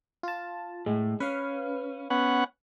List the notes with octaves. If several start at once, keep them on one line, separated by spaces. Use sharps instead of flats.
F4 A5
A2 G#3
C#4 B4 F5
B3 C#4 F#5